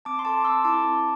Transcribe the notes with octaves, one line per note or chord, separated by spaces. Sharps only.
C4 A5 D6
C6
A4 A5 D6
D6
C4 C6 E6
E4 A5 D6
C4